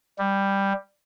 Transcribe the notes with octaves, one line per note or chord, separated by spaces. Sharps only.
G3